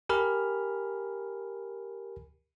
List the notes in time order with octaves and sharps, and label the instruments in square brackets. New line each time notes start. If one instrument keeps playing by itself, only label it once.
[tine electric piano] G4 A#4 G#5 B5 F6